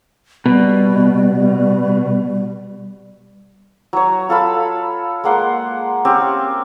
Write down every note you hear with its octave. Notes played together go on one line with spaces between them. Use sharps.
B2 G3
F#3 C#5
F4 A4 F5 B5
G#3 A#3 F#5 C6
C4 C#4 G4